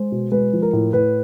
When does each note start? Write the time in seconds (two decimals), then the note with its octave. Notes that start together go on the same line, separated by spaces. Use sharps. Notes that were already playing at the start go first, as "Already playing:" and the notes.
Already playing: G#3 C5
0.12 B2
0.32 G#3 B4
0.53 F3
0.62 A#4
0.73 A2
0.93 A2 B4